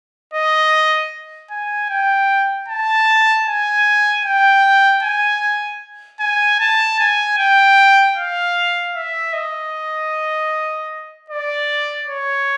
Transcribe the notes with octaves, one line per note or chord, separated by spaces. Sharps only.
D#5
G#5
G5
A5
G#5
G5
G#5
G#5
A5
G#5
G5
F5
E5
D#5
D5
C#5